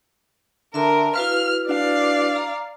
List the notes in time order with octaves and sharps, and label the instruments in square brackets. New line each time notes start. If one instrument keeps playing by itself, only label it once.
[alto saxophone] D3 [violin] A#4 [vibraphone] E5 A5 C6
[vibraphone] E4 F#4 B4 [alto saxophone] F5 [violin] F6
[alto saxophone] D4 [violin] D5 F5
[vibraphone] A#5